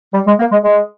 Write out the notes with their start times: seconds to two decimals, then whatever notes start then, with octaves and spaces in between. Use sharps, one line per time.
0.14 G3
0.27 G#3
0.39 A#3
0.51 G#3
0.63 G#3